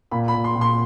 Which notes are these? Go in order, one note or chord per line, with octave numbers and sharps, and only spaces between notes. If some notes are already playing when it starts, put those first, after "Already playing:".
A#2 B5
B5
A#2
C6
A#2
C6